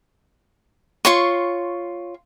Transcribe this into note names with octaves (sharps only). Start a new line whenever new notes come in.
F4 C#5 C6 C#6